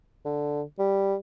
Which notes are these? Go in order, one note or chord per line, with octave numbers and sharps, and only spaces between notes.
D3
G3